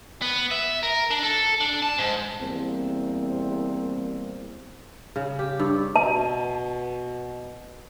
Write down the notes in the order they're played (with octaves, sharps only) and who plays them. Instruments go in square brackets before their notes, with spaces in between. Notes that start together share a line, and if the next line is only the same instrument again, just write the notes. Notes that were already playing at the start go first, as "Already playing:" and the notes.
[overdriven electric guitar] B3
E5
A#4
D4
A4
D4
A5
G#2
[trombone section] E2 G3 A#3 C4
[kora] C#3
G4
G2
[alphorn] B2 [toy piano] A5